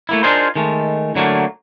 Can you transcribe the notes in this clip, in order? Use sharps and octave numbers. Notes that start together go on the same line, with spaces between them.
A3 A#3 E4
D4 D#4 F4 G#4 A#4 C5
D#3 G#3 A3
D3 F#3 A3 A#3